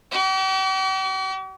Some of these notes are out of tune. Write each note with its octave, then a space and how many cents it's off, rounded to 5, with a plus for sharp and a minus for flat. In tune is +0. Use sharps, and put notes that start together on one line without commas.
G4 -45